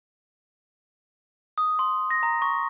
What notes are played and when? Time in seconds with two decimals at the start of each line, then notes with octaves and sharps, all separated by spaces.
1.58 D#6
1.79 C6
2.11 A#6
2.23 A#5
2.42 C#6